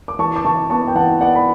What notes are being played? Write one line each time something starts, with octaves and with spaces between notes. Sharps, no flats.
D6
E3 A5 C#6
D6
E3 A5 C#6
B3 A5 C#6
G5
E3 F#5 A5
B3 D5 F#5
B5